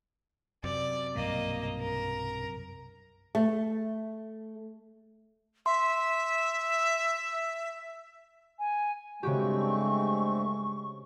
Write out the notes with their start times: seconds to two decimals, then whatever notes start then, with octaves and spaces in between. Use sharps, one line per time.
0.64 F#2 C3 D5
1.16 B1 G2 F#3 A#3 D#5
1.80 A#4
3.35 A3
5.66 E5 C6
8.59 G#5
9.23 G2 C#3 G#3 A3 C4 F#4 G4 C#6